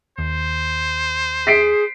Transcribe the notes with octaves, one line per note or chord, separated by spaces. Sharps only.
D#2 C5
G#4 B6 C7 D7